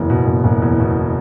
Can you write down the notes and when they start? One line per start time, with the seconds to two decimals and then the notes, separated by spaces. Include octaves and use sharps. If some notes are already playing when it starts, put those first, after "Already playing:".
Already playing: F#1 E2
0.10 B2
0.27 F#1
0.44 F#1
0.62 E2
0.80 B2